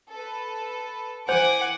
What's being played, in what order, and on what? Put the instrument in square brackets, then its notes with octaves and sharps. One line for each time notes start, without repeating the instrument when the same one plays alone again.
[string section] A4 B4
[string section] E3 G#5 D6 [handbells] C5 [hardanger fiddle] F#5